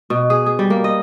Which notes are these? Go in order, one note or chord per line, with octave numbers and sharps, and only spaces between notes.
B2
G#4
G#4
G3
A#3
D#5